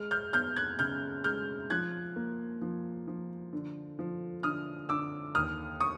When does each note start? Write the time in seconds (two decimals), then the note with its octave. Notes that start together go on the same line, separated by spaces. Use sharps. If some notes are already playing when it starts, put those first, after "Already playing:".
Already playing: G#3 F6
0.11 F6 G6
0.33 B3 F6 G6
0.56 F#6 G#6
0.79 C#3 F6 G6
1.24 G#3 F6 G6
1.70 F3 F#6 G#6
2.16 A#3
2.62 F3
3.07 F3
3.53 D3
3.99 F3
4.43 D3 D#6 F6
4.89 D3 D6 E6
5.35 D#2 D#6 F6
5.80 C#6 D#6